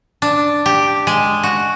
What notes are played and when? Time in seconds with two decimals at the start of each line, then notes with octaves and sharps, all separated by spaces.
0.22 D4
0.66 G4
1.07 G#3
1.43 F#4